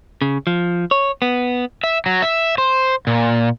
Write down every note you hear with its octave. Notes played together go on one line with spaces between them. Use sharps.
C#3
F3
C#5
B3
E5
F#3
E5
C5
A#2